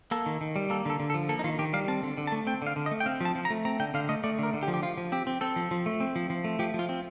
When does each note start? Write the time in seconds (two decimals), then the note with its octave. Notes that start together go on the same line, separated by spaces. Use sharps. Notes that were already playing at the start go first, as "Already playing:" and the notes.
0.11 A#3 A4
0.26 D#3
0.41 D#3
0.56 G3
0.70 A#3 A4
0.85 D3 A4
1.00 D3
1.10 A4
1.14 F3
1.29 A#3 A4
1.39 D#4
1.44 D#3 F4
1.59 D#3 G4
1.73 G3 F5
1.88 C4 A5
2.03 D3
2.17 D3
2.27 A5
2.32 A3
2.47 C4 G5
2.62 D3 F5
2.76 D3
2.86 D#5
2.91 A3
3.00 G5
3.06 C4 F5
3.21 F3 A5
3.35 F3
3.45 A#5
3.50 A3
3.65 C4 A#5
3.80 D3 G5
3.94 D3 F5
4.09 A3 D#5
4.24 A3 D5
4.39 D3 A#4
4.53 D3
4.63 G4
4.68 F3
4.74 G4
4.83 F3 F4
4.98 F3
5.12 C4 G4
5.27 C4
5.41 C4 A4
5.56 F3
5.71 F3
5.86 A3
6.00 C4
6.16 F3
6.30 F3
6.44 A3
6.59 F3 G4
6.74 F3
6.79 F4
6.89 C4